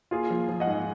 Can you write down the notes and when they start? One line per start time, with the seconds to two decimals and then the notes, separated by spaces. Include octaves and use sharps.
0.11 A#3 F4 G#4
0.30 F3
0.49 F3
0.60 D#5 F#5
0.67 G#2